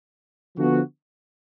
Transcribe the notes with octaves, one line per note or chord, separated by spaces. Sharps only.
D3 F3 B3 F#4